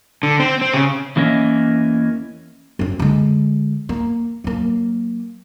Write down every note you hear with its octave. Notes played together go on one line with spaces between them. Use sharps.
D3
C4
C4
C#3
E2 E3 A#3 C#4 D#5 E5
F#2 C4
D3 G#3
A#3
F#3 A#3